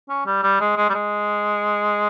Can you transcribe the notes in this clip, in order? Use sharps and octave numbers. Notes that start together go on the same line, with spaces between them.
C#4
G3
G3
G#3
G#3
G3
G#3